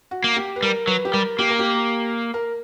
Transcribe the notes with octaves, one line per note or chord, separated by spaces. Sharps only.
F#4
A#3
G4
B4
G3 A#4
F#3 B4
G4
G3 A#4
A#3 G4
A#4
G4
A#4